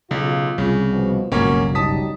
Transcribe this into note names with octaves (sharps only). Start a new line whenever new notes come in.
B1 C#3 F4
C2 C#3
B2 F3
G1 C#2 G#2 B2 F#3 A#3 C#4 C#5
F#3 G3 D#4 A5 D#6 B6